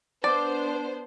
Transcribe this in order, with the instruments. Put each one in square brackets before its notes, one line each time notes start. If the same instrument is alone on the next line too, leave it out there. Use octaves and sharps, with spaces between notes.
[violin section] B3 D4 C5 [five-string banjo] D5